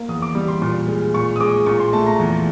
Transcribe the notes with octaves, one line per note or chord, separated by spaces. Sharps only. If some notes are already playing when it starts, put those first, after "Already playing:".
Already playing: A#3
E2 D#6
D6
G3
C6
A#2
G#3
A#2 C#6
D#6
G#3 D6
A#2 C#6
C6
A3 A5
A#5
E2